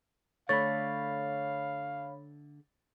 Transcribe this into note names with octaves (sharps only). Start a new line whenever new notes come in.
D3 A3 C#5 F5 B5 A6